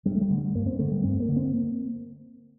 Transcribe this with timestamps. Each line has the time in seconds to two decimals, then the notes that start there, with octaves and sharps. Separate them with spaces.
0.06 G2 G3
0.15 A3
0.21 G3
0.30 D3
0.38 G3
0.55 G2 A#3
0.66 C4
0.79 D3 A3
0.92 G3
1.03 G2 C4
1.20 A#3
1.28 D3
1.36 C4
1.54 A#3